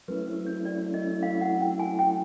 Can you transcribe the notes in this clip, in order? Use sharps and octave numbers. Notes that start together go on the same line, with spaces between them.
F#3 A3 C#4 E4 B4
C5
C#5
D5
D#5
F5
F#5
G5
G#5
G5